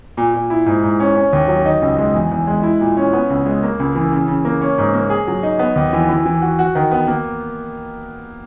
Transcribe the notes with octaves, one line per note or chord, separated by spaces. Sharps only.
A#2
A#2
E4
G#2
G#2
C#4
C#4
D#2
F#3
D#4
C#2
G#3
E2
E2
G#3
E4
A#2
C#4
B3
C#2
G#3
A#3
C#2
E3
C#3
C#3
A#3
C#4
G#2
A#3
G#4
F#3
D#4
B3
D#2
E3
E3
E3
F#4
F#4
D#3
B3
A#3